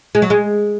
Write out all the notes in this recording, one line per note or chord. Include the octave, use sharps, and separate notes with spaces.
G#3
F#3
G#3